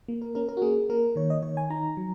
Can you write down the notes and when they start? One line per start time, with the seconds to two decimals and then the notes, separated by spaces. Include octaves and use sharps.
0.08 A#3
0.22 A#4
0.35 C#4 A#4
0.49 A#4
0.57 F#4
0.62 A#3 G#4
0.89 A#3 A#4
1.16 D#3 C#5
1.30 D#5
1.42 D#3 C#5
1.57 G#5
1.70 D#4 A#5
1.97 F#3